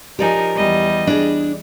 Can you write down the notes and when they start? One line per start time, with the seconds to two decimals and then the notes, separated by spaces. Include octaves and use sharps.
0.19 F3 D#4 G4 A#4 D5 G#5
0.55 E2 G3 D#5
1.07 D4 G#4